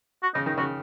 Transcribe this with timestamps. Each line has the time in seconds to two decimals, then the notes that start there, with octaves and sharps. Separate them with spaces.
0.23 F#4
0.35 C#3 D#4
0.46 D#3 D#4
0.58 C#3 F#4